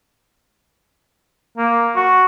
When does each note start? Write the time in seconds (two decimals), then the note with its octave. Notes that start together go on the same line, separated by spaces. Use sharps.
1.57 A#3
1.96 F#4